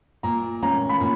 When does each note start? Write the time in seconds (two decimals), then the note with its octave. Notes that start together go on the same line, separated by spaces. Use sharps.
0.23 A#2 A#5
0.62 C#4 A#5
0.89 B5
1.01 A#2